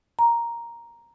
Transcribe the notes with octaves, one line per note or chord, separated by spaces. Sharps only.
A#5